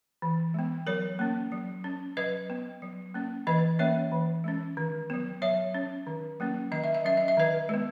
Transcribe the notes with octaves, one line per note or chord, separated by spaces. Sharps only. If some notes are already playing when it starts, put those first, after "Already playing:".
E3
G#3 B3
F#3 A#4 C#5
A#3 C#4
F#3
C#4
F#3 B4 D#5
B3
F#3
A#3 C#4
E3 B4 D#5
A#3 C#4 C#5 E5
E3
G#3 C#4
D#3
F#3 B3
F#3 C#5 E5
C#4
D#3
F#3 A#3 C#4
D#3 D#5
E5
D#5
F#3 C#4 E5
D#5
E5
D#3 B4 D#5
G#3 B3